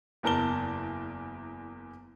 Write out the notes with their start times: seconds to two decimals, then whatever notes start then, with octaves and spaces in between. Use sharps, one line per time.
0.23 F#1 E2 A#4 A5 G7